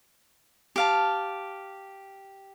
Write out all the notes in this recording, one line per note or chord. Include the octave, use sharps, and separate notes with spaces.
G4 F5 A5